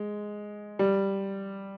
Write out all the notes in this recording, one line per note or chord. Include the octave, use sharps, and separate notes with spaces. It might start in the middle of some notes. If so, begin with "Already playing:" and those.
Already playing: G#3
G3